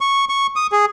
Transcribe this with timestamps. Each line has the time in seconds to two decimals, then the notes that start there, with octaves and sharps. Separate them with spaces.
0.01 C#6
0.29 C#6
0.56 D#6
0.72 G#4